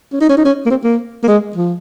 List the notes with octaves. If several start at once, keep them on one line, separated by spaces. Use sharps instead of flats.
C#4
D#4
C#4
D#4
C#4
A#3
C4
A#3
A#3
G#3
F3